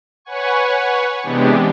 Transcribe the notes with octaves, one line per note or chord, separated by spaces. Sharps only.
B4 C#5 F#5 G#5 C#6
C3 E3 G#3 B3 D4 G4